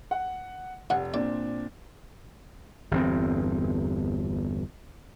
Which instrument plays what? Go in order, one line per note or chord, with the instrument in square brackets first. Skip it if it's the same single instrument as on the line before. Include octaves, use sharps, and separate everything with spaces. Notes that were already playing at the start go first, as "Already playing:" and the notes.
[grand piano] F#5
[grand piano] F1 [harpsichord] G2 F#5 G#5
[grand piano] A#2 C4 D4 [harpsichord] D5
[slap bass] G1 E2 C4